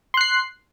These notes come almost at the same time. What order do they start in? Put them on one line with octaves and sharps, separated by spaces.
C6 F#6 C7